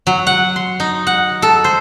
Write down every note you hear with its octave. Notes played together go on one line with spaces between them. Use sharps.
F#3
F#5
C6
D#4
F#5
A4
C5